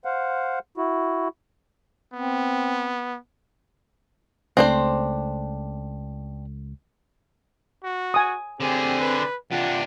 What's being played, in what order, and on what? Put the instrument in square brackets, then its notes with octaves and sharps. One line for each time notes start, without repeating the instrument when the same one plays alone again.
[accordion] C5 F5 F#5
E4 F#4
[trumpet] B3 [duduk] C4
[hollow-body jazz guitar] C#2 A3 [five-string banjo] C4 D4 C5
[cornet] F#4
[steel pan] G#5 D#6
[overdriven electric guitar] D3 G#4 [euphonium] C4 [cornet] G4
[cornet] B4
[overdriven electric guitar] C3 D4 [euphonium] F4 [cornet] F#5